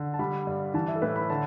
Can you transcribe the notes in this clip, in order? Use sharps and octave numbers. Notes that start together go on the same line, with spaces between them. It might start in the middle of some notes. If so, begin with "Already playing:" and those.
Already playing: D3
A5
G3 B5
G2
E3 A5
E5
A4
A2 B4
B5
D3 A5